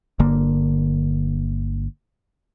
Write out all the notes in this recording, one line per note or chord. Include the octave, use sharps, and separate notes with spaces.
G1 D3 A#3